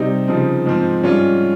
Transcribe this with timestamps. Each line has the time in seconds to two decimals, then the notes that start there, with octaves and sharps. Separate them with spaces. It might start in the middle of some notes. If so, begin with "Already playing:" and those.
Already playing: C3 G3 C4 D#4
0.28 C#3 F3 C4 D#4
0.66 G#2 F3 C4
1.04 G#2 G3 C#4 F4